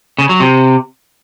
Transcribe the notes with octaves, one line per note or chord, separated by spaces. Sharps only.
C#3
F#3
C3